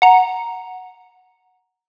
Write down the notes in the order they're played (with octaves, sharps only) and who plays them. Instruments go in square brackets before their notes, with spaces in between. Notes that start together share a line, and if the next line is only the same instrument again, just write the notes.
[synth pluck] F#5 A#5